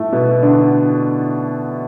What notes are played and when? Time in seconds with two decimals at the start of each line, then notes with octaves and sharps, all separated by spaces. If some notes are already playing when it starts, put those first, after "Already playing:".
Already playing: A2 A3
0.13 B2 B3
0.42 D3 D4